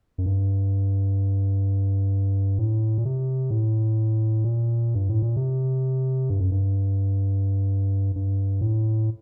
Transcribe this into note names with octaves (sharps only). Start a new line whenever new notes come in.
F#2
G2
A2
A#2
C3
A2
A#2
G2
A2
A#2
C3
G2
F#2
G2
G2
A2